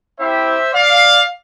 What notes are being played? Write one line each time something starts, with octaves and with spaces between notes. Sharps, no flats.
C4 E4 G4 C5 E5
D5 F5